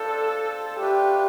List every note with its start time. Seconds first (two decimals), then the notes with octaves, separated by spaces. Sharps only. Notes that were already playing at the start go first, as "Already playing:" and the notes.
Already playing: D4 F4 A4 C5
0.79 A3 D4 F4 G4 B4